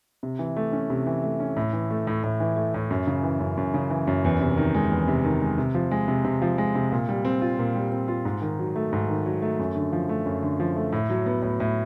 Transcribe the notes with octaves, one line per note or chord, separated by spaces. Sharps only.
C3
E3
A3
C#4
C3
E3
A3
C#4
A2
E3
A3
A2
A2
E3
A3
A2
F#2
C#3
E3
F#2
F#2
C#3
E3
F#2
E2
C3
D#3
G#3
E2
C3
D#3
G#3
C3
F3
G#3
C3
C3
F3
G#3
C3
A#2
G3
C4
F4
A#2
G3
C4
F4
G#2
D#3
F#3
A3
G#2
D#3
F#3
A3
F#2
D3
F3
A3
F#2
D3
F3
A3
A2
F#3
B3
A2
A2